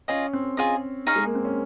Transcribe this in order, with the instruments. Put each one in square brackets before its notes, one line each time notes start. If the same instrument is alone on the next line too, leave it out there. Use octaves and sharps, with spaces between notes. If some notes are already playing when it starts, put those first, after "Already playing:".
[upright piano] C#4 [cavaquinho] F4 G#4 D#5
[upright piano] C4
[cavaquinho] F4 G#4 D#5
D#4 G#4 C#5 F5
[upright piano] G#3
A#3
C4
C#4